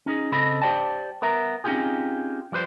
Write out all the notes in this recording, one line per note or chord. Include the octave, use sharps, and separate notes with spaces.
C#4 D#4 G#4
C#3 C4 A4 D#5 B5
G4 C5 D5 G5 A5
B3 A#4 E5 A#5
C4 C#4 D#4 F4 G4 G#4
F3 G3 B4 C5